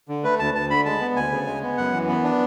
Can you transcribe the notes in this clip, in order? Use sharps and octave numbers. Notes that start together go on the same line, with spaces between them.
D3
A3 B4
D2 A5
D2 A5
D3 B5
G#3 A5
B3
D2 G#5
C#3
G#3
B3
F#2 F#5
E3
B3
D4